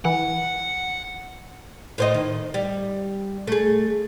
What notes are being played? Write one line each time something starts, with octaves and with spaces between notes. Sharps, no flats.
E3 F#5
A2 C5 D#5
D#3
G3
A3 G#4